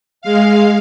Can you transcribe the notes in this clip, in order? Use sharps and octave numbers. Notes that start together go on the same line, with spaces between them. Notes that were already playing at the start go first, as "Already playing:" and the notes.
G#3 F5